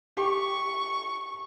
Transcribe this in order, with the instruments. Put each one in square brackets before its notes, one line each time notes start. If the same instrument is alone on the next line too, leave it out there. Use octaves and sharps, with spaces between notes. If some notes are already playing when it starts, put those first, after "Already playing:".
[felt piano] G4 [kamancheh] C#6